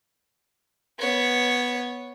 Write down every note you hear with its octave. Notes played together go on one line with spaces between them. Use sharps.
B3 C#5